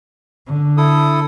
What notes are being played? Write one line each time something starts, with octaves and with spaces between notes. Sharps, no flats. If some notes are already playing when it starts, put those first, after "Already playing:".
D3
E4 A4 D#6